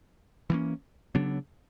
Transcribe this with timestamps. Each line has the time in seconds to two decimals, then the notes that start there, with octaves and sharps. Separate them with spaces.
0.50 E3 G3 A#3 C#4
1.15 C#3 F#3 B3 D4